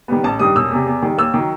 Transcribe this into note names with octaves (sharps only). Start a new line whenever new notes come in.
D#3 G3 B3
A1 A5
G2 D#3 G3 D#6
E1 E6
E2 C3
E2
D#3 G3
D#2 E6
D#3 F#3